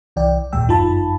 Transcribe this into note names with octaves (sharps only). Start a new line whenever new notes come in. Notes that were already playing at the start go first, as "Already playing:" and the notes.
C2 E3 D5 G5
G#1 D#2 A#2 G#3 G5 E6
G1 F#2 D#4 F4 A5 B5